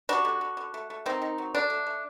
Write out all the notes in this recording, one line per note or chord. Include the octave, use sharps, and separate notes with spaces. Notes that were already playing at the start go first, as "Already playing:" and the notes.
G3 D4 F#4
D3
D3
D3
A3
A3
D#3 C4 D#4
D#3
F#3
D3 D4
A3
A3